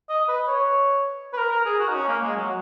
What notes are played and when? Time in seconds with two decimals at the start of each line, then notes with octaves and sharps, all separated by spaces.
0.09 D#5
0.28 B4
0.47 C#5
1.33 B4
1.37 A#4
1.52 A#4
1.65 G#4
1.80 F#4
1.89 D#4
1.94 C#4
2.08 A#3
2.23 G#3
2.36 F#3